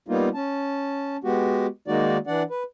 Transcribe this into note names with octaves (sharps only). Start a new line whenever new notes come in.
G3 A#3 B3 D#4 F4
C#4 A5
G#3 B3 F#4 G4
D#3 G#3 A#3 D#4 F#4 D5
E3 D4 D5 F#5
B4